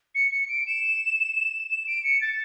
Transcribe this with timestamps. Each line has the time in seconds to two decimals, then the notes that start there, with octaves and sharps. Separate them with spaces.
0.15 C#7
0.31 C#7
0.49 D7
0.67 E7
1.69 E7
1.87 D7
2.04 C#7
2.21 A6